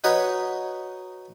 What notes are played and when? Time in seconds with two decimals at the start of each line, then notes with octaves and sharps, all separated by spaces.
0.04 D#4 F#4 B4 C#5 D#5